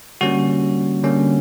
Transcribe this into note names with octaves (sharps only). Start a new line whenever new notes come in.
D3 G3 A#3 C#4 F#4
D3 G3 A#3 C#4